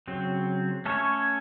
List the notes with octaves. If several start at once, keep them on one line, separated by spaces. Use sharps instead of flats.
C#3 F#3 C4
A3 C#4 A4 C#5